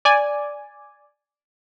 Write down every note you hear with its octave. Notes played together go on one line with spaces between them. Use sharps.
D5 G#5